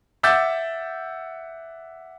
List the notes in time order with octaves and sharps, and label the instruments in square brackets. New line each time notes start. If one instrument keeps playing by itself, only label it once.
[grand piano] E5 F#5 D6 E6 G6 A6